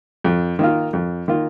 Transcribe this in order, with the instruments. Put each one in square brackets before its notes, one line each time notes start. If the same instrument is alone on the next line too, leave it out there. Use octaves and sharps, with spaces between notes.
[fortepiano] F2
D#3 A#3 F4
F2
D#3 A#3 F4